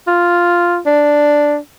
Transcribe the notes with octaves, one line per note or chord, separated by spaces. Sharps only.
F4
D4